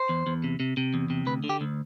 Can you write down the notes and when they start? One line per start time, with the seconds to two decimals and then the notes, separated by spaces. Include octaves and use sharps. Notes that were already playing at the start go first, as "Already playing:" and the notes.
Already playing: C5
0.09 E2
0.27 E2
0.44 C3
0.60 C3
0.77 C3
0.94 E2
1.10 C3
1.26 D2 B4
1.44 D3
1.49 G4
1.61 D2